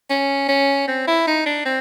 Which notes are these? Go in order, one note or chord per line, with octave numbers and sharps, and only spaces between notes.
C#4
C#4
C4
E4
D#4
D4
C4